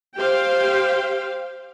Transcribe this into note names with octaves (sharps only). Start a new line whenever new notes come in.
G4 C5 F5 G5